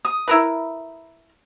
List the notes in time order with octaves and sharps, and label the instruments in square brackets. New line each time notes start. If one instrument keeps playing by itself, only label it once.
[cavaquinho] D#6
[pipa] E4 A#4 B4